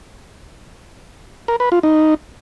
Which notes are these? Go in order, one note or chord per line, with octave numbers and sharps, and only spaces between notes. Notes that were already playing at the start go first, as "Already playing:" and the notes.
A#4
B4
F4
D#4